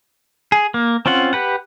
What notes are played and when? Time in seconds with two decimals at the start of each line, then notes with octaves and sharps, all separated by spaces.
0.52 G#4
0.74 A#3
1.06 C4 C#4 F4 F#5
1.33 G4 B4 F#5